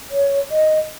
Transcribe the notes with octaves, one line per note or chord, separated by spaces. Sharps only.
C#5
D#5